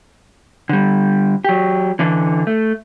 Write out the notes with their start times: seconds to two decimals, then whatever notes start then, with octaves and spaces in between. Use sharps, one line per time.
0.69 D3 G3
1.45 F#3 G4
1.99 D3 E3 D4
2.47 A3